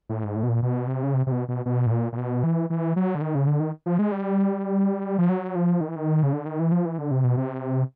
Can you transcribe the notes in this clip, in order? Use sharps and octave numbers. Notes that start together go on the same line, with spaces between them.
A2
G#2
A2
B2
A#2
B2
C3
C#3
C3
C3
B2
B2
B2
A2
A#2
A#2
B2
E3
E3
F#3
D3
D#3
C#3
D3
D#3
F3
G#3
G3
F3
F#3
F3
D#3
E3
D#3
C#3
D3
D#3
E3
F3
E3
D3
C3
B2
C3